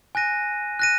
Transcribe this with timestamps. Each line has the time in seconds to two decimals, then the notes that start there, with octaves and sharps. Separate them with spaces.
0.15 G#5 F#6 A#6 D#7
0.79 F#6 A#6 D#7